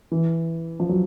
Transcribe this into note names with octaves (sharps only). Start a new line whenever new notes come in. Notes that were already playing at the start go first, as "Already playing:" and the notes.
E3
F3
F#3